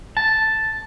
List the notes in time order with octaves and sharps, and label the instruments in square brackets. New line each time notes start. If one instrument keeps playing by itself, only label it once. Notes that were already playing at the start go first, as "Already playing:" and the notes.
[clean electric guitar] A5